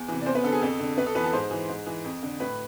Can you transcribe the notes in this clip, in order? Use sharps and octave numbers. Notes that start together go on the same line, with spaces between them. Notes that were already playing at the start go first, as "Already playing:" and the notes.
Already playing: E2
C3 E3
D5
E2 C4 C5
B3 B4
D3 A4
G#4
F2 A4
D3
F2 B3 B4
A4
E3 B3 B4
A4 A5
G#2 C5 C6
E3
G#2
E3
F2
D3
A2 B4 B5